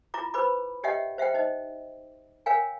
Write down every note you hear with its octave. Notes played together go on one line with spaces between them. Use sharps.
E4 F4 A#5 D6
B4 C5 B5 D6
G4 C#5 D#5 E5 F#5 G5
C5 E5 F#5 G5
D#4 C5 D#5
A#4 C#5 F5 G5 G#5